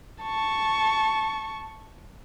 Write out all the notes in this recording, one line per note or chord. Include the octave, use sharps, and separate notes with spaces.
A5 C#6